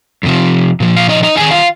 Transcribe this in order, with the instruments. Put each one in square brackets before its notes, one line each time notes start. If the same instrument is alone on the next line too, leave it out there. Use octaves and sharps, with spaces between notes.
[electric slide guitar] F2 C3 F3
A#2 F3
F5
D#4 D#5
D#4 D#5
F2 D#3 G#4 G#5
F4 F5